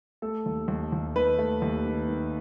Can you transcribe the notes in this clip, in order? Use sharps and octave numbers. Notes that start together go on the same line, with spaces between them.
A3 A4
D#2
D#2
D#2
D#3 B4
A3
D#2
D#3
D#3